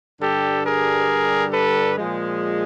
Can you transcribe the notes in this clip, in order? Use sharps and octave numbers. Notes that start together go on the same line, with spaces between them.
G2 D3 G3 G4 A4
G#4 A#4
A4 B4
A#2 F3 G#3